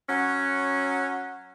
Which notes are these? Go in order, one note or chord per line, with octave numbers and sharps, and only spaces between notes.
F#3 C#4